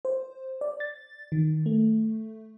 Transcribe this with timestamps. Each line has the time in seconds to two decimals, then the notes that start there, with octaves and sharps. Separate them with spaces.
0.05 C5
0.61 D5
0.80 A6
1.32 D#3
1.66 A3